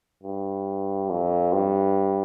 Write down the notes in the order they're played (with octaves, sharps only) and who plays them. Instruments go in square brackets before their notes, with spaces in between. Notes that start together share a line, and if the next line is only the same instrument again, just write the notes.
[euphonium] G2
F2
G2